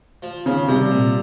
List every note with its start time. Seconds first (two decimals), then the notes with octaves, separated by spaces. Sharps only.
0.22 F3
0.46 C#3 F3
0.68 C3 G3
0.91 A#2